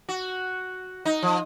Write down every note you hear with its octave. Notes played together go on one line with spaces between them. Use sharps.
F#4
D#4
F3